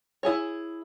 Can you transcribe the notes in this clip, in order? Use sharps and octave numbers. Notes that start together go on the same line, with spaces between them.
E4 G#4 C#5